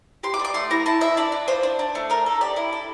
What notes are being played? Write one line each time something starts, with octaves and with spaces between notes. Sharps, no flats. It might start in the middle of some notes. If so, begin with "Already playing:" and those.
G4 C6
D6
D4
D6
A3 C6
E4 A#5
E4 A5
E4 E5
D4 D5
D4
F4 C5
D4
D4
A3
D4 A#4
A4
G4 D5
E4
A4